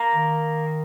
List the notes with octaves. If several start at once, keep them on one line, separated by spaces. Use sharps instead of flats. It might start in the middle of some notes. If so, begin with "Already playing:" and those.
Already playing: A#3
D#3